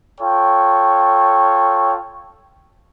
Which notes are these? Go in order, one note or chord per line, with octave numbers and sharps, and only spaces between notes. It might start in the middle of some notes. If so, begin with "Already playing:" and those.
F4 A4 C#5 G5